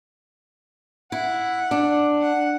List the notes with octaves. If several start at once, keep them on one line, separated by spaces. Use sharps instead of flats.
E4 F#5
D4
F#5